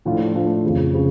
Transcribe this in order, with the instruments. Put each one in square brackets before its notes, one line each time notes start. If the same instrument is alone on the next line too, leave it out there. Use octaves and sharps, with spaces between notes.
[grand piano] A2 F3 A3 D4 F4
A2 F3 A3 D4 F4
F2 C#3 F3
C#3